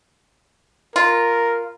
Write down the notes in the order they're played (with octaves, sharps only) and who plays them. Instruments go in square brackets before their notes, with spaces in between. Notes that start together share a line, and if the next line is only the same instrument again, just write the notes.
[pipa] F4 [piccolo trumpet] A#4